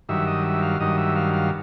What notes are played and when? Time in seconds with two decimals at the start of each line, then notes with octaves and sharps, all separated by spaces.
0.09 G2 D#3 F#3 E5
0.27 D#5
0.44 E5
0.62 F5
0.80 G2 D#3 F#3 D#5
0.98 E5
1.16 F5
1.34 F5